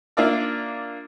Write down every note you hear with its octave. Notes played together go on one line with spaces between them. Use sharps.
A#3 D4 F4 A#4 D5 E5